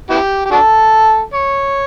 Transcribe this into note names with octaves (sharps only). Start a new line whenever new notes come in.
B3 E4 G4
G4
D4 F#4 A4
C#5